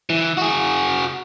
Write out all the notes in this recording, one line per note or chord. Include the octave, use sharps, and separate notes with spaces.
E3
F#4 G#4